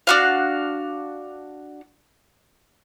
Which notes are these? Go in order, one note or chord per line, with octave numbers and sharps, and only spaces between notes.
D4 F#4 F5